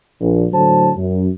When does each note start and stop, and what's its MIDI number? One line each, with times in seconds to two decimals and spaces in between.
0.20 0.45 34
0.52 0.91 45
0.52 0.91 50
0.52 0.91 54
0.52 0.91 72
0.52 0.91 81
0.97 1.28 42